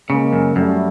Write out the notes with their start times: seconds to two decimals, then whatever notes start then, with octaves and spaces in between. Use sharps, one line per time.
0.09 C#3 G#3 A#3
0.33 F#2
0.56 F#2 G3 A3